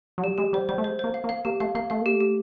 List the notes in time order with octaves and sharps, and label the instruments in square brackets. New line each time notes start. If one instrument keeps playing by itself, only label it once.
[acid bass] F#3
[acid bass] G3 [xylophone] G4
[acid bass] G#3 [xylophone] G4
[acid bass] G3 [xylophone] C5
[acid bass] G3 [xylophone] C5
[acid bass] A3
[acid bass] G#3 [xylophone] C5
[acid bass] A#3 [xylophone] C5
[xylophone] F5
[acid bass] A#3
[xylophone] F5
[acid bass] A#3 [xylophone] G4
[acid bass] A3 [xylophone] F5
[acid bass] A#3 [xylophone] F5
[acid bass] A3 [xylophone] F5
[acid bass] A#3 [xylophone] G4
[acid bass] A3
[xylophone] G4